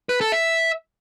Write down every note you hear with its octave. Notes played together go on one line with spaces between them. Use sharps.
B4
A4
E5